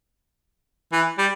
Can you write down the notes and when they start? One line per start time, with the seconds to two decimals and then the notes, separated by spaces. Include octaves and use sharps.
0.93 E3
1.18 G3